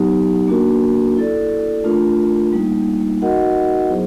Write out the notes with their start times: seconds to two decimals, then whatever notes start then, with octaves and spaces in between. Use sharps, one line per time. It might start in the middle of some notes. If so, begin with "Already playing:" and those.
Already playing: F#3 B3 D#4 G4
0.48 A#3 D4 F#4 A#4
1.16 E4 A4 D5
1.84 A3 D4 F4 A#4
2.52 G3 A#3 D#4
3.22 D#4 F#4 A#4 D#5 F#5
3.89 F#3 B3 E4 G#4 C5